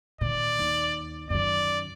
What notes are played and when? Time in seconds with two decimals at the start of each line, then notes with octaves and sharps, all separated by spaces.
0.21 A#2 D#3 D5
0.59 D#2
1.30 F#2 D#3 D5